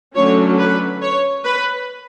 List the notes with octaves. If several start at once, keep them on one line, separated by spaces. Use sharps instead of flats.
D3 F#3 A3 C#4 C#5
B4
C#5
B4